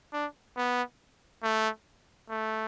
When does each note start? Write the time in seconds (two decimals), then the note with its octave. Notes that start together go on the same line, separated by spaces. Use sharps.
0.13 D4
0.56 B3
1.43 A3
2.29 A3